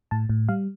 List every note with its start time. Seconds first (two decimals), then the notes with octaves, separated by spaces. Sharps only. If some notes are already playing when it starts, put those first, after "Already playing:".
0.11 A2 A5
0.29 A2
0.49 G3 F5